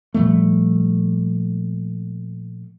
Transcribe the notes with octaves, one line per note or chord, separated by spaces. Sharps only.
A#2 F3 G3 A3